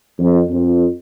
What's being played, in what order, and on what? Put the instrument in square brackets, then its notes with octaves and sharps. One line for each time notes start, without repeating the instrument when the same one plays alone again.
[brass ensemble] F2
F2